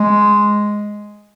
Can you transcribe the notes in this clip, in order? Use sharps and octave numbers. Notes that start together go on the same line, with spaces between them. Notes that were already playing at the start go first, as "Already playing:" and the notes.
Already playing: G#3